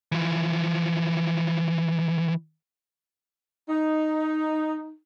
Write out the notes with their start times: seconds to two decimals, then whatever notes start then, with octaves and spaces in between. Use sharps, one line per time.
0.12 E3 F3
3.69 D#4